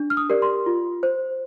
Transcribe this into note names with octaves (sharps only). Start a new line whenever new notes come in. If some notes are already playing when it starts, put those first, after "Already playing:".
Already playing: D4
F6
D#6
G4 A#4 D5
C6
F4
C5